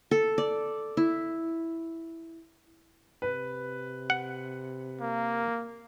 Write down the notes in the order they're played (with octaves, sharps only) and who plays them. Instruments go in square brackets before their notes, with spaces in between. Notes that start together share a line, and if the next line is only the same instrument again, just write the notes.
[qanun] A4
D5
E4
[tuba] C3 [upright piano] B4
[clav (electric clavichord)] F#5
[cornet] A#3